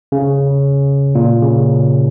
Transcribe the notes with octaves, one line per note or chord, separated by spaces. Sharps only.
C#3
A#2
C#3